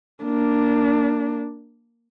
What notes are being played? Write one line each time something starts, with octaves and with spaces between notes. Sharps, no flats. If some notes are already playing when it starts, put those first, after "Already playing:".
A#3 D4